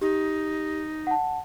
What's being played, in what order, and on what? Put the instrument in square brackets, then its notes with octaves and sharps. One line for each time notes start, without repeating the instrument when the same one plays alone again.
[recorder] D#4 [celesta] G4
[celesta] F#5 A5